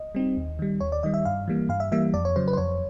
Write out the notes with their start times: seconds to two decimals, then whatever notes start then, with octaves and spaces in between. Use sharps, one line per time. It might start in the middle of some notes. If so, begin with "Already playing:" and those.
Already playing: D#5
0.15 G3 C4 D#4
0.37 D#2
0.59 D#3 G3
0.81 D#2 C#5
0.92 D5
1.03 D#3 G3 D#5
1.14 E5
1.25 G2 F5
1.48 E3 G3 A#3
1.69 G2 F5
1.80 E5
1.92 E3 G3 A#3 E5
2.14 F2 D5
2.25 C#5
2.36 C#3 F#3 C5
2.48 B4
2.53 C5
2.57 F2 C#5